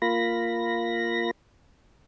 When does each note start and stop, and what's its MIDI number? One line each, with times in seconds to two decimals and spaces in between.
0.02 1.31 58
0.02 1.31 65
0.02 1.31 83
0.02 1.31 94